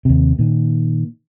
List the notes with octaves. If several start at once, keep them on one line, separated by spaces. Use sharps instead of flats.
D#2 C3
A#2 D#3